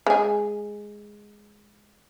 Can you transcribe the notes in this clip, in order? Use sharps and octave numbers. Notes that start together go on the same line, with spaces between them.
G#3 G#4